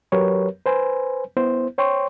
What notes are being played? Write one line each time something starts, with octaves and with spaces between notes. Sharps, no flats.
F#3 G4 A#4 B4 C#5
B4 C5 G#5
B3 E4 C5
C5 C#5 G5 C6 C#6